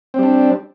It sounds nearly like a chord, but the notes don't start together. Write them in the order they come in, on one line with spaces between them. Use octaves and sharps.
C4 G3 D4